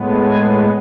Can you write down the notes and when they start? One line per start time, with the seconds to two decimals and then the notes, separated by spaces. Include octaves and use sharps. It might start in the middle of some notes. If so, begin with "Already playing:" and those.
Already playing: A2 G#3 B3
0.25 G#5